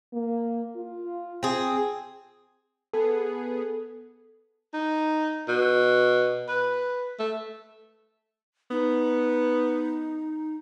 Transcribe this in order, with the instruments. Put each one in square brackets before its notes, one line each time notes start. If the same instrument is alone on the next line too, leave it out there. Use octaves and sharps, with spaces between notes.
[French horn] A#3
F4
[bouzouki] C4 G#4
[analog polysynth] B3 G#4 [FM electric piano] A4
[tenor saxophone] D#4
B2
B4
A3
[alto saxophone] B3 [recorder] D#4